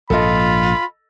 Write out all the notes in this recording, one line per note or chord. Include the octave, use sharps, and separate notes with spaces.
A#1 G#2 F4 A4 D#5 B5